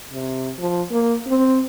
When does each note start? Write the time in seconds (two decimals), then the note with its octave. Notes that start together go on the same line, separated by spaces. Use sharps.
0.12 C3
0.59 F3
0.91 A#3
1.28 C4